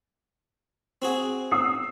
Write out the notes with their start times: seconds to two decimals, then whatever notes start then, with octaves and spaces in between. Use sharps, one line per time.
1.02 C4 F#4 G#4
1.51 D#6 E6 C7